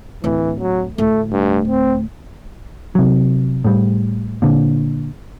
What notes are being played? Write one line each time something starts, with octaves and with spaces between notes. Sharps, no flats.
D1 E3
F#3
D2 A2 A3
G2
C4
C3 F#3
A2 G3
A#2 D3